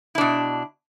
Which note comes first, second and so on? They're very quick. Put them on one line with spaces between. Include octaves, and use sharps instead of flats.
E4 D4 B2